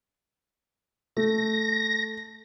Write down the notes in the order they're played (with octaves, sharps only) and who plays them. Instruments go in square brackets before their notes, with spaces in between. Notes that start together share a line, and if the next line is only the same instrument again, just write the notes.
[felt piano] A3 [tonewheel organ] A#6